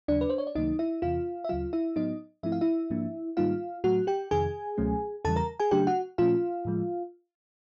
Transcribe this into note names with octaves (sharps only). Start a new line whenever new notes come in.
D#2 C#3 F#3 D4 D5
B4
C5
C#5
D5
C#2 C3 D#3 F#3 A#3 D#4 D#5
E4 E5
E2 C3 E3 F4 F5
E5
D2 C#3 F#3 F4 F5
E4 E5
A2 F#3 B3 D#4 D#5
G#2 F3 A3 C4 E4 E5
F5
E4 E5
G#2 F3 A#3 D4
G#2 D#3 G3 A#3 D#4 F4 F5
A2 F#3 A3 F#4 F#5
G4 G5
F2 C3 D#3 G#4 G#5
C#2 B2 F#3 A3 C#4
E2 C#3 E3 G3 A4 A5
A#4 A#5
G#4 G#5
C#3 F#3 A3 D4 G4 G5
F#4 F#5
A#2 F3 A3 C#4 F4 F5
A2 F3 G#3